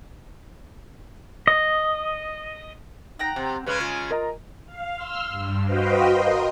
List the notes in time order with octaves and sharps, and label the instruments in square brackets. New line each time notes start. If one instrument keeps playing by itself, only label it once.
[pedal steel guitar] D#5
[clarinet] D#4 [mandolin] F#5 G5 A#5
[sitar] C3 [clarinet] C4
[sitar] C#3 G#3 C#4 [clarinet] B4
[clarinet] F4 [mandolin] G#5
[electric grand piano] A#4 D#5 A#5
[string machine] F5
C6 E6 F6
G2
F#4 B4 C5 D#5 F5 G5
A#4 D#5 C6